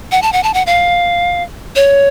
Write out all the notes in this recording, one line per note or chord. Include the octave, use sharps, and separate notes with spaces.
F#5
A5
F#5
A5
F#5
F5
C#5